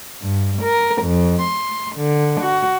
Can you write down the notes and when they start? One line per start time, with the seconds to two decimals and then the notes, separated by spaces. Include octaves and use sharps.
0.22 G2
0.61 A#4
1.01 F2
1.42 C6
1.95 D3
2.39 F#4